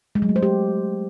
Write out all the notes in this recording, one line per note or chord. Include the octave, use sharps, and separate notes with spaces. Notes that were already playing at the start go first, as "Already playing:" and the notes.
G#3
F#3
A3
C5
G4